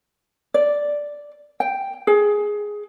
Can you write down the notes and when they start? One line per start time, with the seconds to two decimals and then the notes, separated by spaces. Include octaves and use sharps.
0.54 D5
1.60 G5
2.07 G#4